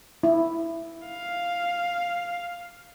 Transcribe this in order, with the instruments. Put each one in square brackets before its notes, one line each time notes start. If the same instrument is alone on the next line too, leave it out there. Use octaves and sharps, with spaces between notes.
[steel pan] E4
[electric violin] F5